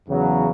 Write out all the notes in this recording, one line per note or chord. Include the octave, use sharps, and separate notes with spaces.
E2 C#3 F#3